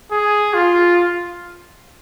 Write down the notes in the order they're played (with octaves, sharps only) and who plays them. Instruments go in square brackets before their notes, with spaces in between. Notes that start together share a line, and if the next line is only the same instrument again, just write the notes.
[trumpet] G#4
F4